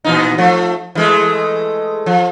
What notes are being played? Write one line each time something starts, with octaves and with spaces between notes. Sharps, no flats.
A#2 E3 D#4
F3 A3
E3 G#3 A3
F3